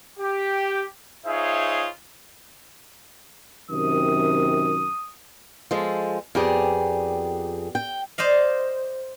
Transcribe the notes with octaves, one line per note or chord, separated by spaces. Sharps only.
G4
D#4 F4 G#4 C5 C#5 E5
F#2 C3 D#3 D#6
F3 G#3 A4
F2 B3 G4 G#4 D5
G5
C5 D5 D#5 F5